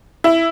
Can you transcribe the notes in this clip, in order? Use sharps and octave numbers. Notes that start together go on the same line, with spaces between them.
E4